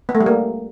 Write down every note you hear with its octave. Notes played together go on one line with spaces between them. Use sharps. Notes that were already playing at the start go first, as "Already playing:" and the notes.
B3
A3
G3
A#3